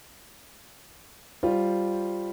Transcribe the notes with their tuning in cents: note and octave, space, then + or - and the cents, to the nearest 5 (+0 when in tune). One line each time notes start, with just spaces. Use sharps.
G3 +0 F4 +0 C5 +5